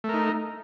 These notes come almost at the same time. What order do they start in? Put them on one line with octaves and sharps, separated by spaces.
A3 A#4 D#4